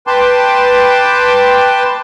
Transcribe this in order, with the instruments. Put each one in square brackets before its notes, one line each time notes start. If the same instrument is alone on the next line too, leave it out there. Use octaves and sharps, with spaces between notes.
[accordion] B4 G5 A5 C6 D6